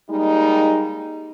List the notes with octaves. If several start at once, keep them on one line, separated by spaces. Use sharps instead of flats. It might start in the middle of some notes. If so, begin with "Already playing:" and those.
G3 G#3 A#3 D#4